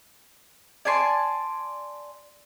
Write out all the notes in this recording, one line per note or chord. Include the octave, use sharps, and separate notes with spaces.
D5 G#5 A5 C6